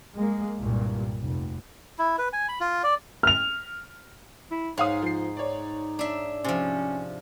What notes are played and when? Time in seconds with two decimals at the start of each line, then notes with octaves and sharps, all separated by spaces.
0.15 G#3 A#3
0.60 C2 G2 A#2
1.22 F1
1.99 E4
2.18 B4
2.33 G#5
2.49 B5
2.60 F4
2.83 D5
3.23 F6 F7
4.51 E4
4.78 G#2 D#4 C#5 F5 D#6
5.02 F3 C7
5.37 C#5 D5
5.99 D4 E5
6.44 C3 F3 C#4